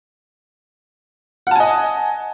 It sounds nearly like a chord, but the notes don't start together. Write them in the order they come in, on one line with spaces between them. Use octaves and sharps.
F#5 A5 G#5 D#5